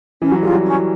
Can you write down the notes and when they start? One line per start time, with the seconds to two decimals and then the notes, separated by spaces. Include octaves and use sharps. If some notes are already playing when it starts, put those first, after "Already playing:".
0.22 E3 C#4
0.32 F#3
0.42 G3 F4 G#4
0.53 F#3
0.64 C#4